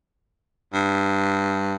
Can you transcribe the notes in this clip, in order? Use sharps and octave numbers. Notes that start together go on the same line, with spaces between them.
G2